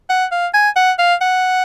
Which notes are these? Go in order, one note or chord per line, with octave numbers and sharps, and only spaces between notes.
F#5
F5
G#5
F#5
F5
F#5